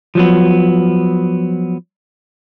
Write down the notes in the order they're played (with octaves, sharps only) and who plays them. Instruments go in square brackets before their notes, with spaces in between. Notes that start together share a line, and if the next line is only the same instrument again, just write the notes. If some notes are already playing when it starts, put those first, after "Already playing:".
[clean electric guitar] F3 F#3 B3